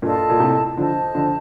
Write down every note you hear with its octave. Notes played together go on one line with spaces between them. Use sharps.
G2 A#2 F4 A4 D#5 A5
A#2
A2 C3
D3 F3 C5 D#5 A5
D3 F3